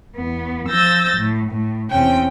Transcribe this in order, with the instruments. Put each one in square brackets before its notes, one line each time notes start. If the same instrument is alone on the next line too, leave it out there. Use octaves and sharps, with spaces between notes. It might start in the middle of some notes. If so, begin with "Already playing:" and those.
[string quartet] E2 B3
F3 E6 G6 A6 A#6
A2
A2
E2 C3 C#4 G5